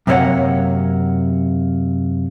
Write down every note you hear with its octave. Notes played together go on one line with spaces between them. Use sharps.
F#2 C3 A#3 B3 C#5 F#5